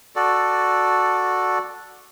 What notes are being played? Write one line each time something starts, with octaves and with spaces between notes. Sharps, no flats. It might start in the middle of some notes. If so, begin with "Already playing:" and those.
F#4 A4 D5